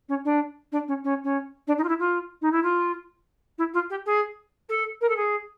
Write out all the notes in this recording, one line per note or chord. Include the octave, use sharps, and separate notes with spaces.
C#4
D4
D4
C#4
C#4
C#4
D4
D#4
F4
E4
F4
D#4
E4
F4
E4
F4
G4
G#4
A4
A#4
A4
G#4